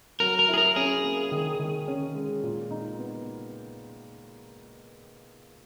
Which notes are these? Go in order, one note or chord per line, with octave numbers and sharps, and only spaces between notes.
F#3 A#4
A#4
E4
G#4
A#4
C#4 G#4
A#3
D#3
D#3
C#4
G#3
A#2
D#4
B3